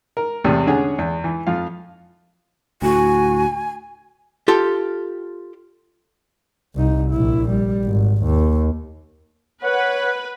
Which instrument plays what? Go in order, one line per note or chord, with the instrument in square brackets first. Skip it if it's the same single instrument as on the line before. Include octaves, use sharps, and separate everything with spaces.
[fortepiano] A#4
E2 A2 C3
D3 C#4 G#4 F#5
E2
E3
F2 F4 F5
[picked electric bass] D2 A2 [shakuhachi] F#4 [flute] G#5
[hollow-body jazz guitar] F4 G4 A4
[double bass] C2 D#4
A#1 E4
G3
G#1
D#2
[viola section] B4 [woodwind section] C#5 F#5